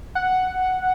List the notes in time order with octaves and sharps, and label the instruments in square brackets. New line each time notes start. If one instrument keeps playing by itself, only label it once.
[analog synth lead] F#5